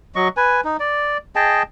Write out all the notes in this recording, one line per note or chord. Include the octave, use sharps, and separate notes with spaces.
F#3 D#5 C#6
B4 G#5
D#4
D5
G#4 D#5 G5 A5